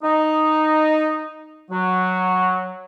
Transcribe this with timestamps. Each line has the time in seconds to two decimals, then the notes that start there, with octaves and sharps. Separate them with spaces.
0.03 D#4
1.71 F#3